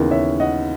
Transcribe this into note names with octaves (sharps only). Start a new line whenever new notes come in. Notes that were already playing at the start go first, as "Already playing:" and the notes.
Already playing: D#2 C#3 E3 B3 A#4
C#5 E5
D#5 F#5